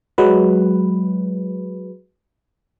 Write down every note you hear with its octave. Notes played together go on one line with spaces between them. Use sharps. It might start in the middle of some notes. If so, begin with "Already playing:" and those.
F#3 G#3 B4